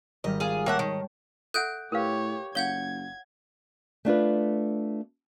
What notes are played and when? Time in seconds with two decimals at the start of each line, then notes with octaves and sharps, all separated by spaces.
0.24 G#1 G3 D#5 F6
0.40 F4 G#4
0.66 A#3 C#5 E5 F#5 G5 A5
0.79 D#3
1.54 A4 E5 F#5 F#6 G6 D7
1.92 A2 G4 A#4 B4 C#5 F5
2.55 F#1 C#5 F5 F#5 G6 G#6 G7
4.05 A3 D4 F4 B4